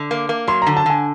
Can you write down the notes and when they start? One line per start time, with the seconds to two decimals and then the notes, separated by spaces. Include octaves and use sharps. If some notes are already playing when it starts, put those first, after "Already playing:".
Already playing: D3
0.11 A#3
0.29 A#3
0.47 F#3 C6
0.62 D3 A#5
0.77 A5
0.86 D3 G#5